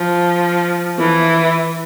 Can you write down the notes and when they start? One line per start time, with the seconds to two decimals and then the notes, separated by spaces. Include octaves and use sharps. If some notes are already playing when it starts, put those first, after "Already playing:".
Already playing: F3
0.99 E3